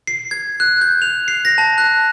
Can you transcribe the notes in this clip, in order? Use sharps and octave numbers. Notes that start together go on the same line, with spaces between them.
C7
G#6
F#6
G6
F7
C7
A#6
A5
F#6